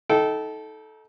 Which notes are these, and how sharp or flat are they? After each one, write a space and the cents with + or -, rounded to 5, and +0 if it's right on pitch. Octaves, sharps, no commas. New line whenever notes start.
D#4 +25 A4 -15 G5 -25